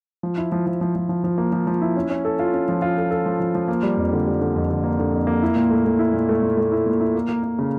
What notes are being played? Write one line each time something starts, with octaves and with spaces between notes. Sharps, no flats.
F3
E4
F3
F3
F3
F3
F3
F3
A#3
F3
F3
E4
C#4
C#4
A4
F4
C#4
F3
F4
A4
A4
F3
F3
F3
A#3
G3
F2
D3
G3
D3
F2
D3
A#3
D3
F2
A#3
E4
A#2
A3
A3
E4
A#2
A3
A#2
A3
E4
A#2
E4
A#3
A#3
A#3
C#3